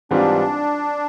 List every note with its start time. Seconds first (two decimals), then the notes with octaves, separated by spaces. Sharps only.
0.11 G#2 E3 G3 C4 D4 F4